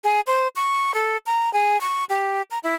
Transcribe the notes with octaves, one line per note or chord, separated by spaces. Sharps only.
G#4
C5
C#6
A4
A#5
G#4
C#6
G4
A#5
E4